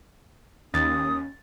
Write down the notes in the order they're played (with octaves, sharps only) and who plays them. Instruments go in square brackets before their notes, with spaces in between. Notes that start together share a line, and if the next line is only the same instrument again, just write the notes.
[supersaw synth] D#2 [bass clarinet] C#4 [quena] D#6 [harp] A6